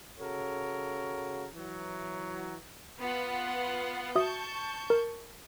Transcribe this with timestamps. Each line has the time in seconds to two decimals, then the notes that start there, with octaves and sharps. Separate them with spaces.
0.19 C#3 F#4 A4 A#4 C#5
1.54 E3 F#3
2.99 B3 F4 F#5
4.15 F#4 E5 A5 C#6 D#6 G6
4.90 A#4